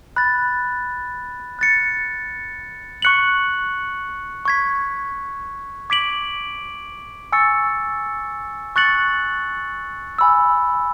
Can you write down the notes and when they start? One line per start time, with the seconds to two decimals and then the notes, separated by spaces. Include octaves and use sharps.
0.16 B5 F#6 A6
1.59 F#6 A6 C#7
3.02 C#6 F#6 C#7 F#7
4.45 C#6 G#6 B6
5.90 D6 G#6 B6 D7 F#7
7.32 G#5 C#6 E6 A6 C#7
8.76 C#6 F#6 A6 C#7 F#7
10.19 G#5 B5 E6